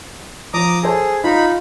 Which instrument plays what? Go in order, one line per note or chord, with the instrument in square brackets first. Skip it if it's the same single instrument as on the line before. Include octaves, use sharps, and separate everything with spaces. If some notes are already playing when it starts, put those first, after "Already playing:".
[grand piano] F3 [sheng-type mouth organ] A#5 D6 D#6
[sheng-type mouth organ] G#4 [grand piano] A4 C5 A5
[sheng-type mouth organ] D#4 B5 [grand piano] F4